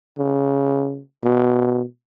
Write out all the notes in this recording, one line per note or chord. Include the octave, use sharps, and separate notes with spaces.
C#3
B2